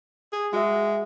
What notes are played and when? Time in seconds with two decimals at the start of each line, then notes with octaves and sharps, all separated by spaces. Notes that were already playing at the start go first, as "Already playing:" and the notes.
0.33 G#4
0.53 G#3 F#4 E5